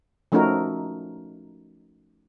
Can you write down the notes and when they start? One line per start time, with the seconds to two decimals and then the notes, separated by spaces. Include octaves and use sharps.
0.32 F3 A3 C#4 D#4 F#4 A#4